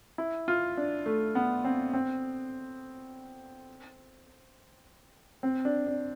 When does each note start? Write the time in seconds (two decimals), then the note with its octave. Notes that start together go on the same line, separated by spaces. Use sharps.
0.18 E4
0.48 F4
0.77 D4
1.06 A3
1.35 B3
1.65 C4
1.93 C4
5.43 C4
5.65 D4
5.87 D4